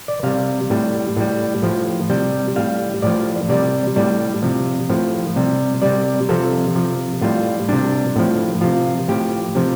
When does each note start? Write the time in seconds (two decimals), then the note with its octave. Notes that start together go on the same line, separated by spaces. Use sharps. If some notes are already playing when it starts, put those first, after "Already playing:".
0.08 D5
0.23 C3 G3 F5
0.70 A2 G3
1.17 A2 G3
1.62 A2 F3
2.10 C3 G3 G5
2.56 A2 G3 F5
3.02 A2 F3 D5
3.49 C3 G3 D5
3.96 A2 G3 D5
4.42 C3 F3
4.89 A2 F3
5.36 C3 G3
5.82 C3 G3 D5
6.29 C3 F3 A4
6.75 C3 F3
7.21 A2 G3 F4
7.69 C3 G3 D4
8.16 A2 F3
8.61 C3 F3 F4
9.08 A2 F3 G4
9.55 C3 F3